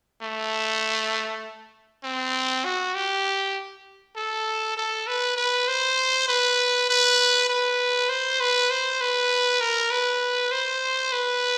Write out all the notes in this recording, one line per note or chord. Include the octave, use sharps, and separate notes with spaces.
A3
C4
F#4
G4
A4
A4
B4
B4
C5
B4
B4
B4
C5
B4
C5
B4
A#4
B4
C5
B4